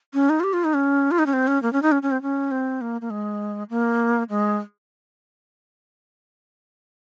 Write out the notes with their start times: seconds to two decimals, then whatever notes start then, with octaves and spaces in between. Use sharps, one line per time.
0.14 C#4
0.29 D#4
0.40 F4
0.44 G4
0.53 F4
0.64 D#4
0.74 C#4
1.11 F4
1.19 D#4
1.26 C#4
1.33 C4
1.47 C#4
1.62 A#3
1.73 C#4
1.82 D#4
1.92 C#4
2.02 C#4
2.11 C4
2.22 C#4
2.51 C4
2.81 A#3
3.01 A#3
3.10 G#3
3.70 A#3
4.30 G#3